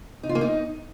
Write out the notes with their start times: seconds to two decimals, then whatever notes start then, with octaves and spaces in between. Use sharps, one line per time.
0.23 D#4
0.29 F4
0.35 A#3
0.41 D#4